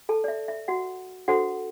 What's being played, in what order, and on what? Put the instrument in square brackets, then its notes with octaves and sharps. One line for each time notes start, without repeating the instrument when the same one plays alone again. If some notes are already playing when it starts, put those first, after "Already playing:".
[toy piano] A4 A5
D5
E5
E5
F#4 F#5
D4 F#4 A4 C5 F#5